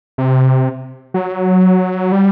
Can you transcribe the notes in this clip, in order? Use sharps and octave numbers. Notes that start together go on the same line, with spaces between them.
C3
F#3
G3